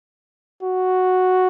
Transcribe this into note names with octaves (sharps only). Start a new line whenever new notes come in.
F#4